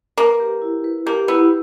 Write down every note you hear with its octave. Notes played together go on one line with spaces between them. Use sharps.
A#3 B4
G4
E4
B4
A#3 G4
B3 E4